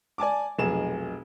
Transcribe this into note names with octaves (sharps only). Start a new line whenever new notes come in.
D5 G#5 A5 D6
F1 B1 G#4 E7